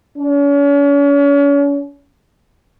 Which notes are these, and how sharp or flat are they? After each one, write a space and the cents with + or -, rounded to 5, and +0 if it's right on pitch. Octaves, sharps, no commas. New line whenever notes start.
C#4 +40